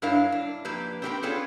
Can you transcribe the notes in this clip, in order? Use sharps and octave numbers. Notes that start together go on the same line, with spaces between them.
G2 D4 E4 A#4 C#5 F5
D4
F2 A#3 G4 B4
C4 D4 G4 A#4 B4 G5
B3 C#4 D4 F4 G#4 A4